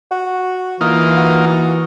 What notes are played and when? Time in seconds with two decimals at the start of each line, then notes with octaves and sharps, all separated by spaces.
0.11 F#4
0.81 E3 A#3 D#4 F4
1.17 F#4